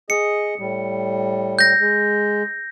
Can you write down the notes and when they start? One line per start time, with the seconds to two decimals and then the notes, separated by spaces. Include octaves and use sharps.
0.10 G#4 D#5 C#7
0.59 A2 G3
1.59 G6 A#6
1.80 G#3